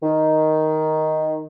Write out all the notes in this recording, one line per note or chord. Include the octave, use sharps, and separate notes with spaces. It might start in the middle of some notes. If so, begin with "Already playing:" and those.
D#3